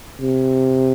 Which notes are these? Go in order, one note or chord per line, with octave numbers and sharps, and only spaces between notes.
C3